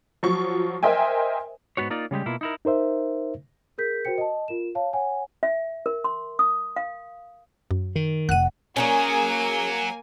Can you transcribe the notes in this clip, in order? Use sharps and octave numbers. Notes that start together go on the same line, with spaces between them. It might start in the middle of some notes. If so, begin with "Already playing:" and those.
F3 F#3 C#6
A#4 C5 D#5 E5 G5 G#5
G#2 B3 F#4 C#5
A#3 D#4 F4 D5
C#3 G3 G#3 G4
B2 A#3 E4 F4
D#4 E4 A#4
D#4 A#4 C5 E5
G#4 A#4 G6 B6
F#4 A#4 C5 G5 C#7
D#5 A5
F4 A#4 E7
C#5 F5 A5
C#5 F#5 G#5
E5
A#4
C6
D#6
F5
F#2
D#3
F1 F#5 F#6 D#7
F#3 A#3 C#4 D#4 G#4 G#5